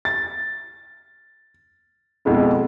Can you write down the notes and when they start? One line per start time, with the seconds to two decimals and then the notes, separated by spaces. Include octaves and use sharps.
0.05 A6
2.25 F2 B2 G#3 E4